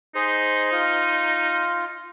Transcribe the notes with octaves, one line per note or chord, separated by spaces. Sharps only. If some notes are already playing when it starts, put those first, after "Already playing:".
D#4 G#4 C5
F4